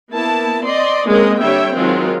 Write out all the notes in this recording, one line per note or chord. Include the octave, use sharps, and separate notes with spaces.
A#3 B3 E4 A5
C4 D5 D#5 C6
G#3 A#3 C4 C#4 A#4 D#5
D3 G3 C#5 E5 G5
D#3 F#3 G#3 C4 F4